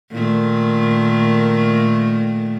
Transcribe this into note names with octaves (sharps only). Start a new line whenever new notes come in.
A#2 D#3 A3